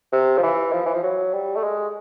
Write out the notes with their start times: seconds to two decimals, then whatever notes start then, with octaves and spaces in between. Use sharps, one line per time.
0.12 C3
0.38 F3
0.43 E3
0.72 F3
0.86 E3
0.94 F3
1.03 F#3
1.33 G3
1.56 A3
1.63 G#3